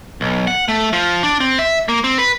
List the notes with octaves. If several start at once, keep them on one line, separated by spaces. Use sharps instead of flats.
B1
F#5
A3
F3
D4
C4
E5
A#3
C4
B4